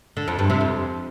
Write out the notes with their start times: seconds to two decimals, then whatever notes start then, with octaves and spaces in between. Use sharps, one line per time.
0.17 D3
0.28 F2
0.39 G2
0.50 C3
0.61 F2